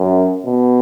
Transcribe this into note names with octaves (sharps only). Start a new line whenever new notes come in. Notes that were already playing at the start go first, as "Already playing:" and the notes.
Already playing: F#2
B2